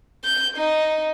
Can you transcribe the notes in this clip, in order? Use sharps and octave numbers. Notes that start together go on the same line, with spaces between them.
G6
D#4